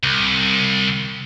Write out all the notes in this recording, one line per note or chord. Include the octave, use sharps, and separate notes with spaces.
C2